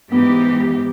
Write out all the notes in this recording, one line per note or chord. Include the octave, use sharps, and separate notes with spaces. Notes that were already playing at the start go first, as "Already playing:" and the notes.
G#2 E3 B3 G4